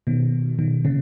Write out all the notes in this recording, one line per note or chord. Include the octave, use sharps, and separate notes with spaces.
B2 D#3
B2 D#3
A#2 C#3